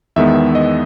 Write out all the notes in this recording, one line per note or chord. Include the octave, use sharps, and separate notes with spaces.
E2 D#3 G#3 B3 E5
D#5